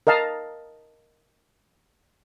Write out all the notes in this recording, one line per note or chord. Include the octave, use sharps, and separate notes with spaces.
A#4 D#5 F5 A5 A#5